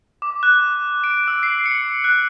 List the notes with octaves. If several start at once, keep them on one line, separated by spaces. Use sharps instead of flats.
D6
F#6
D7
E6
C7
C#7
F#6